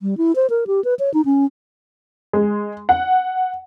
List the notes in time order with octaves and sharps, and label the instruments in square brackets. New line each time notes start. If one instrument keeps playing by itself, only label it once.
[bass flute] G3
E4
C5
A#4
G4
B4
C#5
D#4
C#4
[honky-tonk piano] G#3
F#5